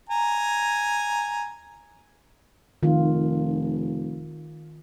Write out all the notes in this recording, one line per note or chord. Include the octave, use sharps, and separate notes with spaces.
G#5 A#5
F1 D#3 F4